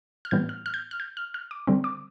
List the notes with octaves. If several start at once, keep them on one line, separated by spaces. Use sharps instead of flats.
F6
A2 E3 G3 B3 G6
F6
F6
G6
F6
G6
F6
F6
D6
D3 G3 C4
D6